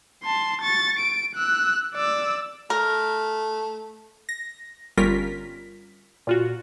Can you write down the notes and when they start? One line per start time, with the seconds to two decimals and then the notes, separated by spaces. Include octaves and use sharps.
0.24 A5 C6
0.62 C#6 A6
0.99 D7
1.35 E6 F#6
1.95 D5 E6
2.70 A3 A#4
4.29 A#6
4.97 G1 G3 C#4 F4 A#4 B6
6.27 A#2 F4 F#4